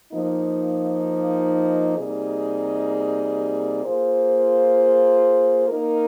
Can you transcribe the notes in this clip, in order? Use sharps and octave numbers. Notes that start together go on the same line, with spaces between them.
F3 A#3 D#4
C3 G3 A#3 D#4 G#4
A#3 F4 G#4 C5
A#3 D#4 A#4